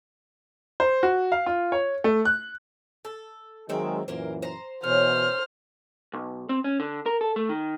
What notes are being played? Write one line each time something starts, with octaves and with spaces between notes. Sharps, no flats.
C5
F#4
F5
F4
C#5
A3
F#6
A4
D#3 F#3 G#3 A#3 C4 E5
F#2 A#2 E3 A#3 A#4 C5
C5 A#5
B2 E3 C#4 C5 F6
B1
C4
C#4
D3
A#4
A4
A3
D#3